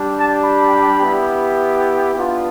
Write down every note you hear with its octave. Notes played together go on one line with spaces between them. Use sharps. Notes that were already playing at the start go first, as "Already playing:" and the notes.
Already playing: G3 D4 G4
A5
B5
B3 E4 G4
B3 D4 F4